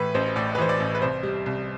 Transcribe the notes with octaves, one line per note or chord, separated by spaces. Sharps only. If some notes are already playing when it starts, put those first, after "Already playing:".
Already playing: A2 E3 B4
A1 C5
A2 D5
B4
E3 C5
D5
A1
B4
C2 C5
G3
C2